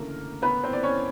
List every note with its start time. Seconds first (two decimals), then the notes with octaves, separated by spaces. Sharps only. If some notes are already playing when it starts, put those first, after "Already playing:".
Already playing: D2 C#3 E3 A3 A#3 A#4
0.42 B3 B4
0.64 C4 C5
0.73 D5
0.83 C#4 C#5